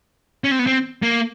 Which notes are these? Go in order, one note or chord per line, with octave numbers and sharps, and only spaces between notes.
C#4
C4
B3
C4
A#3